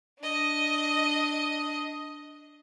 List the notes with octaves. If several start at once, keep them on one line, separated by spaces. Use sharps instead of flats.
D4 D#5